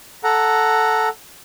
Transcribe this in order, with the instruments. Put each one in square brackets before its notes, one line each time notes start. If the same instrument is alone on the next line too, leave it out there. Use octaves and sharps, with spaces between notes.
[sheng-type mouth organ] A4 F#5 A#5